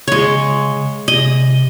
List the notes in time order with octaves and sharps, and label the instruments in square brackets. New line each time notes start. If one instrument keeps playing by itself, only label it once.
[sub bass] C#3 [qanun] G#3 C#5
[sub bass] C3 [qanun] D#5